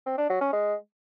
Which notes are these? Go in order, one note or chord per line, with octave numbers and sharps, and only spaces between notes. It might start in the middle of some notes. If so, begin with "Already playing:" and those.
C4
D4
F#3
C#4
G#3